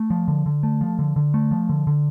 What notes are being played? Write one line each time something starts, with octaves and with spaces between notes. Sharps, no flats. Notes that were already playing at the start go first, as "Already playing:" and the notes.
Already playing: A3
F3
D3
D3
A3
F3
D3
D3
A3
F3
D3
D3